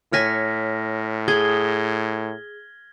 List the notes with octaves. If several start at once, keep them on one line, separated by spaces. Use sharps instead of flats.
A2 C#5 G#5 F6 A#6 B6
G#4 G#6 G7